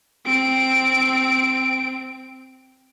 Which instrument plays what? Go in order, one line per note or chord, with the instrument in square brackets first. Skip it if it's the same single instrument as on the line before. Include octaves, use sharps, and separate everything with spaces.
[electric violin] C4 D7